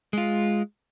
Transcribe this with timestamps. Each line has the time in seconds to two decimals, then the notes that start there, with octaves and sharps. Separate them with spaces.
0.13 G#3 F4